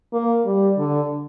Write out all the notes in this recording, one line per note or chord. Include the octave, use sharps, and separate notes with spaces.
A#3
G3
D3